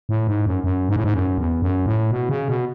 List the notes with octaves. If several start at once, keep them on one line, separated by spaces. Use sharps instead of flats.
A2
G#2
F#2
F#2
G#2
A2
G#2
F#2
E2
F#2
A2
B2
C#3
B2